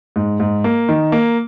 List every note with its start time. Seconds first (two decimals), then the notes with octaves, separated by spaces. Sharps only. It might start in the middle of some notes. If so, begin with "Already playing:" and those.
0.16 G#2
0.40 G#2
0.64 A#3
0.89 D#3
1.12 A#3